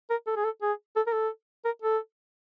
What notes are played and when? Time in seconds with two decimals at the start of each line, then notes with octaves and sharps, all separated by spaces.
0.10 A#4
0.27 A4
0.36 G#4
0.44 A4
0.62 G#4
0.96 A4
1.07 A#4
1.13 A4
1.65 A#4
1.82 A4